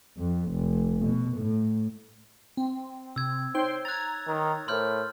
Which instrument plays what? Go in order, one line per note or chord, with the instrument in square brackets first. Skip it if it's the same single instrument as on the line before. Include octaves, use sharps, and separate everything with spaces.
[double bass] F2
F1
B2
A2
[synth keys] C4
[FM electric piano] C3 [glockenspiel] E6 G#6
[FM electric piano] D#4 C#5 [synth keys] C5 G5 C6
[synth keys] A#5 G#6 [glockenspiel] F#6 A6
[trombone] D#3
[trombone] A2 [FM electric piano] A#4 C5 D6 [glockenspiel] C6 F6 G6